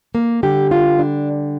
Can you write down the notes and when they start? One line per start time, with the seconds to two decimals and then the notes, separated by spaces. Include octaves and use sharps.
0.15 A#3
0.43 D3 G3 G4
0.71 F4
0.99 D4